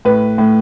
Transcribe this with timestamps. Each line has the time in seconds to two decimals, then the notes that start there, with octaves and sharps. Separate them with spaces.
0.05 A2 B4
0.38 A2